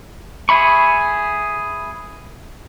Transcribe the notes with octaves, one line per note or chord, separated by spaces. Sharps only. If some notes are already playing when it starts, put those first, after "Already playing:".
G#4 E5 B5 C#6